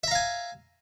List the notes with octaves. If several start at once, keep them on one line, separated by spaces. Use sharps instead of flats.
E5 F5 G#5 A#5